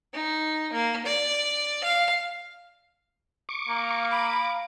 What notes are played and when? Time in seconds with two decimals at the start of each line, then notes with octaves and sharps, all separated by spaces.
0.13 D#4
0.72 A#3
1.06 D5
1.84 F5
3.49 C#6 D6
3.68 A#3 F5 A#5
4.11 B5 D6